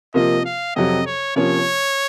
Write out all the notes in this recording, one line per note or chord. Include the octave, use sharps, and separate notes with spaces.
C3 F3 A#3 F4 D#5
F5
F2 C3 F#3 D#5
C#5
C3 F3 A#3 C#4 C#5